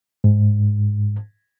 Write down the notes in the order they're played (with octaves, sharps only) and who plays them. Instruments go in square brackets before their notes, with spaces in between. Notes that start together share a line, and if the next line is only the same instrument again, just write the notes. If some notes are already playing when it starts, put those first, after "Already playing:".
[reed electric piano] G#2